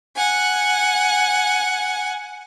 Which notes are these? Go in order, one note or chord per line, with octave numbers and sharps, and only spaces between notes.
F#5 G#5